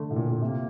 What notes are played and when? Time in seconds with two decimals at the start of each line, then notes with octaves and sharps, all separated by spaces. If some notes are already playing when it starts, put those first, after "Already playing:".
Already playing: D3 A3
0.11 A2
0.16 A#2
0.30 A#2
0.41 C3 A#3